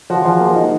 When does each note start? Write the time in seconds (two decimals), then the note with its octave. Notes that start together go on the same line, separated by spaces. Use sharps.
0.10 F3 F#4
0.24 F3 G#4
0.40 A#3
0.56 D#4